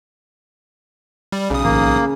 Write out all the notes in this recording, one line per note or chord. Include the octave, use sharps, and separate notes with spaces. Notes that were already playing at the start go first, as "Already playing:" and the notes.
G3
B1 C#3 D#6
A1 A#3